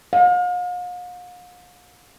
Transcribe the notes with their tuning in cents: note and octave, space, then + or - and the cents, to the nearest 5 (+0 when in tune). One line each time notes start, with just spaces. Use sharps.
F5 +45